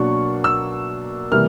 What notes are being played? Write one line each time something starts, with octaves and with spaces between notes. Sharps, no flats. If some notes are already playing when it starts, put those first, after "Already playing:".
Already playing: B2 F#3 A#3 D4 C#6
E6
C3 E3 G3 A#3 F6